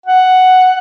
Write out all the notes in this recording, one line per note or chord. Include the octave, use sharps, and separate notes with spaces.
F#5